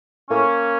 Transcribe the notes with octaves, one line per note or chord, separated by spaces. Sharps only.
A2 A#3 C#4